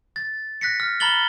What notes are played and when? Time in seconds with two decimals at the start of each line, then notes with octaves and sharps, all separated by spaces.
0.16 A6
0.61 F#6 A#6 B6 C#7
0.80 F6
1.00 A#5 B5 F6 A6 F#7 G7